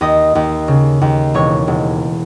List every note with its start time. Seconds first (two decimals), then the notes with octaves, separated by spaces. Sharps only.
0.01 D#2 D#5 D#6
0.35 D#2
0.68 C#3
1.01 D#2
1.34 E1 C#5 C#6
1.68 E1